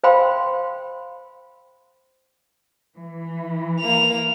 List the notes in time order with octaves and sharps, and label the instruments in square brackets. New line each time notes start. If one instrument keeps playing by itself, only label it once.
[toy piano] C5 F5 G5 B5 C6
[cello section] E3
[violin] A#3 F7